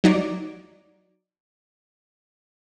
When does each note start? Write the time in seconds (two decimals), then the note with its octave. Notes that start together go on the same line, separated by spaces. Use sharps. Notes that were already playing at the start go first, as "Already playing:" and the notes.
0.04 F#3 D#4 D5